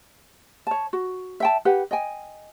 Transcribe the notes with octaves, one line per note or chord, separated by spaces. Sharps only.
C#5 A5
F#4
E5 G5 A5
G4 B4 F#5
D#5 G5 G#5